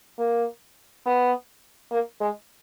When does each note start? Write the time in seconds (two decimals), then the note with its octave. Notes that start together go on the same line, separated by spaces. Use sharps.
0.19 A#3
1.06 B3
1.91 A#3
2.21 G#3